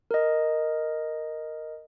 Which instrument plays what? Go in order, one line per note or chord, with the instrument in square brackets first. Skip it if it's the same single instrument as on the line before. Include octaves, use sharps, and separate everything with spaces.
[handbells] A#4 D#5